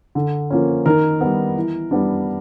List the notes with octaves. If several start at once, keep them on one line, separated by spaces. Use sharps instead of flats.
D3
F3 A#3 C#4
D#3 A#4
G3 B3
E3
G3 B3 D4